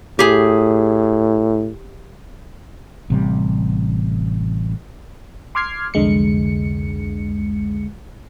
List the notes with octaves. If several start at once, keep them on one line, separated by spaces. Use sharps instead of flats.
A2 G4 G#4
A1 C3 G3
C6 D6 F6 G#6 C7
C2 F2 D3 G#3 C#7